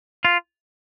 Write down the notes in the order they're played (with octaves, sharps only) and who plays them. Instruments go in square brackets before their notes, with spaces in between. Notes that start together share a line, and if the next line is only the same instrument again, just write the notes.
[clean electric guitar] F4